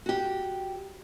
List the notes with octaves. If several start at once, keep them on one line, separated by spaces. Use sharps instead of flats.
F#4 G4